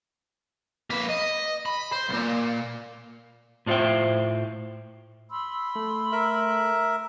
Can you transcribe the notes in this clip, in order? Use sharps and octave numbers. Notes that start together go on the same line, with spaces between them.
A#3 B4
D#5
B5
C5
B1 A#2
A2 D4 F4 C5 E5 G5
B5 C6 E6
A3
A#4 E5